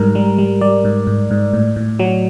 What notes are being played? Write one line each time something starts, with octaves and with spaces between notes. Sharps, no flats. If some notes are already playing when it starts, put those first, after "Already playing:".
Already playing: G#2 G3 A#4
G3
G3
G3 D5
G#2
G#2
G#2
A2
A2
F#3